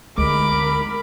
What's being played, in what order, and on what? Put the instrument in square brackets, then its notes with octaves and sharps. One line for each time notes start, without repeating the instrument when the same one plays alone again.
[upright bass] D2 [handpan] G#3 [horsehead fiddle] A#4 B5 [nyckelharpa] D6